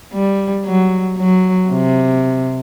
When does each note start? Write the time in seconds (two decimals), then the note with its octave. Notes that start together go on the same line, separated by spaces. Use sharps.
0.14 G3
0.66 F#3
1.18 F#3
1.70 C3